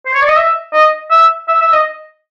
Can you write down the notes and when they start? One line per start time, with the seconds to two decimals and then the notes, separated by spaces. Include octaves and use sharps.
0.06 C5
0.14 C#5
0.22 D5
0.28 D#5
0.36 E5
0.73 D#5
1.11 E5
1.48 E5
1.61 E5
1.73 D#5